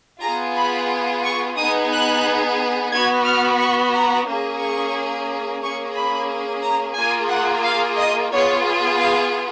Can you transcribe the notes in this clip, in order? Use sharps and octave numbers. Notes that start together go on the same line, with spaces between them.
B3 F4 G#4 A#5
B5
C#6
B3 D#4 G#4 D#6
F#6
B3 F#4 G#6
F6
C#6
A#5
A#3 C#4 G#4
C#6
A#3 C#4 G#4 C#6
B5
A#5
A#3 F4 G#4 G#5
F#5
F5
D#5
B3 F4 G#4 C#5
F5